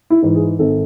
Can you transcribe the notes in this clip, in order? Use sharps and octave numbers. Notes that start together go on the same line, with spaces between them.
E4
G#2 E3
G#4
G#1 A4